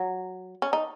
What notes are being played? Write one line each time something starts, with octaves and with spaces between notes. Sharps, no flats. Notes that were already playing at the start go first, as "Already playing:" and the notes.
Already playing: F#3
C#4
D#4